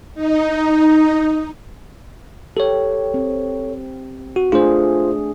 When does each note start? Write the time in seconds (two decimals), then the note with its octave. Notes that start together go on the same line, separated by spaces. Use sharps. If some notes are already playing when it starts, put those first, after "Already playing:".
0.14 D#4
2.57 G4 A4 C#5
3.14 C4
4.36 F#4
4.52 A3 D4 F4 G#4 C5